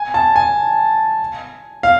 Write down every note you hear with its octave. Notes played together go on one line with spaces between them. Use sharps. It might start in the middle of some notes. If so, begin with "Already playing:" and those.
Already playing: G#5
A5
G#5
F5